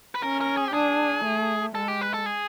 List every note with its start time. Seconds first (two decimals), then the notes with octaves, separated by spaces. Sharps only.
0.15 B4
0.23 C#4 A#4
0.41 A#4
0.57 G#4
0.68 G4
0.74 D4 G#4
1.25 A3
1.75 G#3 A4
1.88 G4
2.01 B4
2.14 A4
2.26 G#4